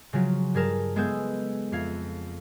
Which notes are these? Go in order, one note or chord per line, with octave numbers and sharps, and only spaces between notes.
C#3 F3 F#3
G2 G#4 A#4 A5
G#3 B3 G#4 A4 E6 G6
F2 F5 G#6